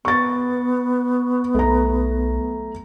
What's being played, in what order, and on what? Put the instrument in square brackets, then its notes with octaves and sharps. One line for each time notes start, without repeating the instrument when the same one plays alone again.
[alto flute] B3 [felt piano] C#6 A6
[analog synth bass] B1 [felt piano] A3 A#5